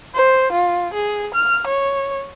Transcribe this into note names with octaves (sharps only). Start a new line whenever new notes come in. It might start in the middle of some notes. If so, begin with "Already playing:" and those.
C5
F4
G#4
F6
C#5